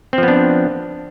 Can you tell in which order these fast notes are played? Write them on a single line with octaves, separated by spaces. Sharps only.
C4 F3 B3 D4